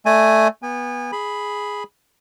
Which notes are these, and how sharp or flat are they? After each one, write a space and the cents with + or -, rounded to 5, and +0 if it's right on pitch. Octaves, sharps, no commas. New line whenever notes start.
A3 +0 D5 +25 G#5 +0
B3 -15 G#5 -35
G#4 +0 B5 +0